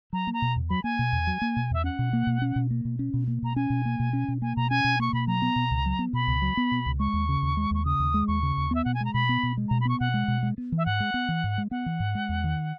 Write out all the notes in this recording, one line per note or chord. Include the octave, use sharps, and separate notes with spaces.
F#3 A#5
A#3
A#5
B2
E2
F#3 B5
A#3 G#5
B2
E2
F#3
A#3
B2
E2 E5
C#4 F#5
B2
A#3
B2
C#4
B2
A#3
B2
C#4
B2
A#3
B2 A#5
C#4 G#5
B2
A#3
B2
C#4
B2
A#3 G#5
B2 A#5
C#4 G#5
B2
A#3 C#6
B2 B5
F#3 A#5
B3
B2
C#2
F#3
B3
B2 B5
C#2
F#3
B3
B2
C#2
G#3 C#6
D#2
C#3
D#2
G#3
D#2 C#6
C#3 D#6
D#2
G#3
D#2 C#6
C#3
D#2
B3 E5
B2 F#5
G#5
G#3 A#5
B2 B5
B3
B2
G#3
B2 A#5
B5
B3 C#6
B2 F#5
G#3
B2
G#3
B3
E3
E5
G#2 F#5
G#3
B3
E3
G#2
G#3
B3 F#5
E3
G#2
G#3
E2
D#3